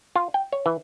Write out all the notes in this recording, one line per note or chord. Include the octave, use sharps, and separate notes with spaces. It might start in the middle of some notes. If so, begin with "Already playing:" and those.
F4
G5
C#5
E3